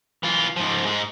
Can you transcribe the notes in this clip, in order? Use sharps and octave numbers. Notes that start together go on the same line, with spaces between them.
E3 F4
G#2 F3
G#2 G#3